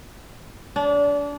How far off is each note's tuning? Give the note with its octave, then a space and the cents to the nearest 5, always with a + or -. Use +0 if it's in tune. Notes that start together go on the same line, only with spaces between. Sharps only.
D4 -30